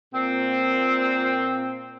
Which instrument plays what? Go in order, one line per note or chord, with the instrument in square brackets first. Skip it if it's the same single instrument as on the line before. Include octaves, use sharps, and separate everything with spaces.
[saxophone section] A#2 C4